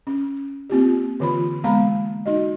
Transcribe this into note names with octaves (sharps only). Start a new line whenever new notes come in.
C#4
A#3 C4 F4 G4
D3 E3 F4 B5
G#3 A#3 B3 F5 A#5 B5
D#4 F#4 D#5